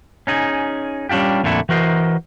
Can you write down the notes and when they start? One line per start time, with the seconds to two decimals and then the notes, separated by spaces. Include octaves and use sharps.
0.27 C#4 D#4 G#4
1.09 G3 C#4 D4 F4 G4
1.44 F2 A#2 D3 A3 E4
1.69 E3 F#4 A#4 C5 D#5